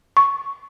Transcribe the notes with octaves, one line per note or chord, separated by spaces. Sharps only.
C#6